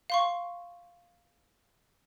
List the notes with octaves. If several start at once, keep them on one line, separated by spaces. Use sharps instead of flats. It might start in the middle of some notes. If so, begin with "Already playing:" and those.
F5 C6 C#6